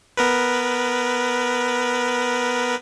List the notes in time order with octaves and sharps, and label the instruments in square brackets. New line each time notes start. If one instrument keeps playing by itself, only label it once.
[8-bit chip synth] B3 A#4 B4